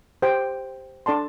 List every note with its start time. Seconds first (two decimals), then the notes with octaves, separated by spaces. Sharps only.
0.22 G4 C5 G5
1.06 D4 A4 D5 A5 C6